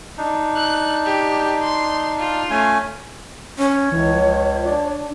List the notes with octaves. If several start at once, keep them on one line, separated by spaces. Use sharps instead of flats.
D4 D#4
F#6
G4
C6
F4
A3 C#4 G#5
C#4 C#5
C#2 E3
F3
D4